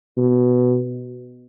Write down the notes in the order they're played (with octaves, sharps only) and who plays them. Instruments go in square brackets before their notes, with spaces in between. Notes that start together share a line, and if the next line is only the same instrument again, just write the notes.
[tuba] B2